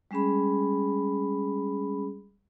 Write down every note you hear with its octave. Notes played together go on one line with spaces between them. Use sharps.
G3 G#3 C#4 G#4 B5